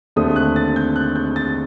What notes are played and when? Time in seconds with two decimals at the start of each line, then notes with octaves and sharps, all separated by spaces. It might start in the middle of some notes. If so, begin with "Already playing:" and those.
0.16 D#2 D3 A3 C4 D#6
0.36 F#6
0.56 A6
0.76 G6
0.96 F#6
1.16 G6
1.36 A6